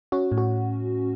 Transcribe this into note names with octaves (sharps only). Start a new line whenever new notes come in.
C#4 F#4
A2
F#4